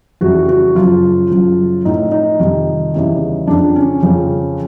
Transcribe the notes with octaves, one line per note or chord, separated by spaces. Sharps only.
F2 C#3 E3 G3 F#4
F#4
F#2 C#3 F3 F4
F#2 C#3 F3
A2 F3 D#4
D#4
F2 C3 D#3 G3
E2 C#3 E3 G3
F2 C#3 F3 D4
C#4
F2 C#3 F3